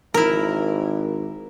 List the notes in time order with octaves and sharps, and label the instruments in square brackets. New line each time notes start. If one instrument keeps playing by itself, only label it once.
[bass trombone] G#1 [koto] E4 A#4